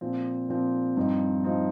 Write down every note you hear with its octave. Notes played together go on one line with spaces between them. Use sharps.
A#2 F3 C4
A#2 F3 C4
G2 F3 C4 D#4
F3 C4 D#4